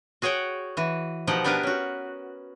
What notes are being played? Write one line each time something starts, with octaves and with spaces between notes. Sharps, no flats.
F#4 G#4 C#5 F#5 G5
E3 F#4
B2 F3 D#4 G4 F#5
B3 D4 G4 A#4 B4
C#4 F#4